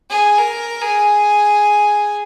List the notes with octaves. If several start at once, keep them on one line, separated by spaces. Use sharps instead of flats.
G#4
A#4
G#4